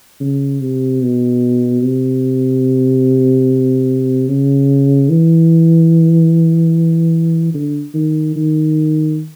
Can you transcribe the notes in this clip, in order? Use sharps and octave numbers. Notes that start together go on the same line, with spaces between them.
C#3
C3
B2
C3
C#3
E3
D3
D#3
D#3